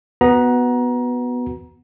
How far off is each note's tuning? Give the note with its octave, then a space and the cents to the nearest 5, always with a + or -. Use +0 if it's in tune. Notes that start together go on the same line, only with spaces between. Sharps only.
B3 +0 F#4 +0 A#5 +25